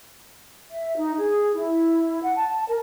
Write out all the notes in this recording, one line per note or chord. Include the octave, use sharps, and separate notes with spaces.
E5
D#4
G#4
E4
F#5
A5
A#4